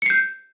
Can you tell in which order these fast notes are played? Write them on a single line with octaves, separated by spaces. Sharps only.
C#7 C7 G6